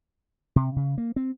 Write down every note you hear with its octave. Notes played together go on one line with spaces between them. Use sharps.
C3
C#3
A#3
C4